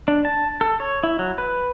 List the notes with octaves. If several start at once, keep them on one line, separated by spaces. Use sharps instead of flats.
D4
A5
A4
C#5
E4
F#3
B4